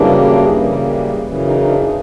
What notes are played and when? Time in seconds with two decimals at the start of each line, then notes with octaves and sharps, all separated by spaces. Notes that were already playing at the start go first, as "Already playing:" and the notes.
Already playing: F#2 C#3 E3 G3 A#3 D4
0.58 F#2 C#3 E3 G3 A#3
1.24 F#2 C#3 E3
1.46 D#4
1.61 D#4
1.68 D4